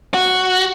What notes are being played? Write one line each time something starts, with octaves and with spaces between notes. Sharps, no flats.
F#4